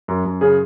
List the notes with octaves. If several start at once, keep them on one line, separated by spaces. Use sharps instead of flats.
F#2
F#2
C#3 G#4